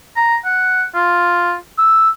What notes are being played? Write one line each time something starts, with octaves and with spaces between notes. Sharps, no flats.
A#5
F#5
F4
E6